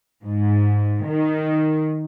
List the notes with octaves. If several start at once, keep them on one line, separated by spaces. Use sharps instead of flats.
G#2
D#3